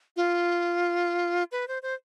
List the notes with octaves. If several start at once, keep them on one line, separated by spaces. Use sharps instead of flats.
F4
B4
C5
C5